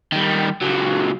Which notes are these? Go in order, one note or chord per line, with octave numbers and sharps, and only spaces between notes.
D#3 G3
C#2 F#3